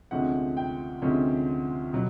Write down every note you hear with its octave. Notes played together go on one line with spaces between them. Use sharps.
D2 C3 F3 G#3 C#4 F#5
G5
D2 C3 F3 G#3 C#4
B2 F#3